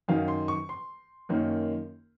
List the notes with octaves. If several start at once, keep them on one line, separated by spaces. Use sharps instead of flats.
F#2 D#3 F#3 F5
C6
C#6
C6
F#2 D#3 A#3 C#4